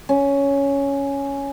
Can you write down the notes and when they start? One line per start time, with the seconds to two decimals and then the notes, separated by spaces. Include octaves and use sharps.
0.09 C#4